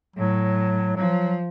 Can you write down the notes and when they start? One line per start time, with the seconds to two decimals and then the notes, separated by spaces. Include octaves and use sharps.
0.16 A2 F#3
0.96 F3 F#3